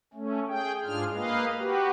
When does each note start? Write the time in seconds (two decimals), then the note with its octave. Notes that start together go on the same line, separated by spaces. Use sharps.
0.13 A3 C#4
0.48 G#4 G5
0.84 G#2 D4 F4 G#4 F6
1.14 A#3 B4 D#5 F5
1.58 F#4 G4 B4